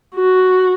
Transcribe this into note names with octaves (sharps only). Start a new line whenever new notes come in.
F#4